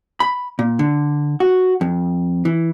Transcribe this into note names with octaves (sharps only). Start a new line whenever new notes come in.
B5
A#2
D3
F#4
F2
E3